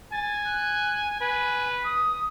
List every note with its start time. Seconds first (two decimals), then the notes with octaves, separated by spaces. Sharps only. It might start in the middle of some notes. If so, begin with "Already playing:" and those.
0.12 G#5 A6
0.45 F#6
1.21 B4 G#5
1.84 D#6